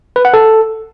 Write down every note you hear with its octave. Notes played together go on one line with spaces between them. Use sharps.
B4
F#5
A4